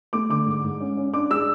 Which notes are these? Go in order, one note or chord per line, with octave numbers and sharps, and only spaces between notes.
A3 D6
D3 D6
G#2
G#2
C#4
C#4
D4 D6
G#3 E6